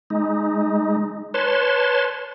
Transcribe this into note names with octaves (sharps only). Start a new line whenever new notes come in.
G#3 D#4
B4 C#5 A5 C6